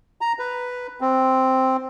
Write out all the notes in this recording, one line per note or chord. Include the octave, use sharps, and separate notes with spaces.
A#5
B4
C4